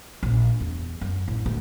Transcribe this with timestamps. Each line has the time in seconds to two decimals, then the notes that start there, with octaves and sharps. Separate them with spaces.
0.23 A#1
0.60 E2
1.01 F#2
1.28 A1
1.46 D2